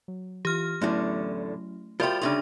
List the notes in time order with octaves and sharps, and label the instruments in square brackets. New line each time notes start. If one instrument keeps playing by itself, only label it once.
[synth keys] F#3
[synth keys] E3 F4 [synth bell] G4 F6
[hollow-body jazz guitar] E2 A2 D3 [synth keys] F#3 C#4 E4 [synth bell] A3
[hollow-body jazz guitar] F3 G3 [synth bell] F#4 D5 C6 [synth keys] A#4 E5 G5
[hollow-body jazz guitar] D2 C#3 G3 [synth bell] D4 C6 [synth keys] D#4